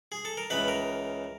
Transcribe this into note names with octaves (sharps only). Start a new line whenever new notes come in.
G#4
A4
A#4
C#2 C#3 E3 B4
A#4